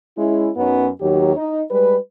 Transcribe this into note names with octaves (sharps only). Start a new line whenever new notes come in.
G#3 C#4 E4
F#2 F#3 B3 C#4 D#4
D#2 D#3 F#3 G4 C#5
D#4
G3 G#3 B4